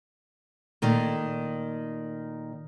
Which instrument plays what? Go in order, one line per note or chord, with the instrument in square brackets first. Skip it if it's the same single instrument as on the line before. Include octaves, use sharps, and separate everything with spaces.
[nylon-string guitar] A#2 D#3 A3